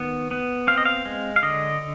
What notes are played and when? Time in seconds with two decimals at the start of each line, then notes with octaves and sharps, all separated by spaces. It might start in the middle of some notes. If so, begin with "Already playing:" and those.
Already playing: D#3 B3
0.31 B3
0.67 C4 F5
0.78 D#5
0.85 F5
1.06 G#3
1.36 F5
1.42 D3 D#5